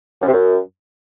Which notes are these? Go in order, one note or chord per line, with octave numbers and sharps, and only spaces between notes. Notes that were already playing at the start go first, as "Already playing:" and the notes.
F#2
C3
F#2